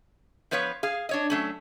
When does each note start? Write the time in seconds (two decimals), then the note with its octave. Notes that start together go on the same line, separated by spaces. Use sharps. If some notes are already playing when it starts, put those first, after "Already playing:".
0.51 F3 B3 B4 C#5 F5
0.83 G#4 F5
1.09 D4 C#5 D#5
1.30 F#3 A3 C#4